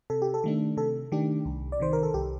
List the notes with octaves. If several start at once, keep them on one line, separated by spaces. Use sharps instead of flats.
C3 A4
G4
A4
D#3 A3 D4
C3 A4
D#3 A3 D4 G4
C2
D5
C3 D#3 C5
A#4
A4
C2 G4